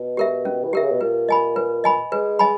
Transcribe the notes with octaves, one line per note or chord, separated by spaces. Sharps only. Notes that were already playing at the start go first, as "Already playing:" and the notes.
Already playing: B2
G4 A#4 E5
C#4
E3
D#3 G4 A#4 E5
C#3
B2
A#2 B4
D#5 G#5 B5
B4
D#5 G#5 B5
G#3 B4
D#5 G#5 B5